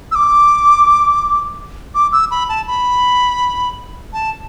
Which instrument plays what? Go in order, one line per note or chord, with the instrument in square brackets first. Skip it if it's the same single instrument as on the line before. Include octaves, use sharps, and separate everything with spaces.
[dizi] E6
D6
D6
E6
B5
A5
B5
A5